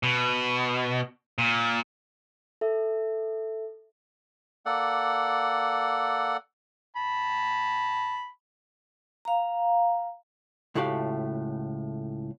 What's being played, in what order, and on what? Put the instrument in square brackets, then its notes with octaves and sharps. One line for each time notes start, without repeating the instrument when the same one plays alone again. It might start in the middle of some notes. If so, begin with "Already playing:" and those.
[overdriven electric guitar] B2
A#2
[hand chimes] A4 E5
[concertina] A#3 A4 D5 F#5
[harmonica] A5 B5
[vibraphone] F5 A#5
[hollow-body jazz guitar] C#2 A2 A3 F#4 G4 F5